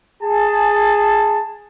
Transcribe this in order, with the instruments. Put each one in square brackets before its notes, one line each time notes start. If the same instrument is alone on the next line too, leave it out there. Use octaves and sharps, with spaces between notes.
[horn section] G#4 A5